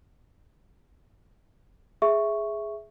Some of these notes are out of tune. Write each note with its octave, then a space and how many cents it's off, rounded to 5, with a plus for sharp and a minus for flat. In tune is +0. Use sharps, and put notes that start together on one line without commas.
G#4 +5 E5 +0 C#6 +0